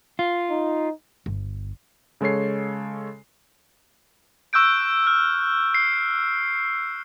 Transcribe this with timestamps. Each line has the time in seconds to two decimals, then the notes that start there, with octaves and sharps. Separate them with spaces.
0.19 F4
0.51 D#4
1.26 G1
2.21 C#3 G#3 A4 C#5 C7
4.53 C#6 E6 F#6 G6 D7
5.07 F6
5.74 C7